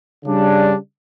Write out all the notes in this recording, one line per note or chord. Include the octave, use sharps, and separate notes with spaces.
C#3 G3 D4